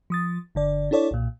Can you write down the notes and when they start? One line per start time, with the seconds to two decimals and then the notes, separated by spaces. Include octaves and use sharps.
0.10 F3 D#6 A6
0.55 G1 D3 D5
0.91 D4 E4 A4 C#5 D5
1.11 B1 A#2